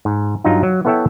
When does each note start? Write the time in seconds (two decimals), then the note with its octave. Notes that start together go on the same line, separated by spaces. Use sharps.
0.05 G#2
0.44 G2 F#3 D#4 F4
0.63 F#3
0.85 B3 E4 A4 C#5 E5 G5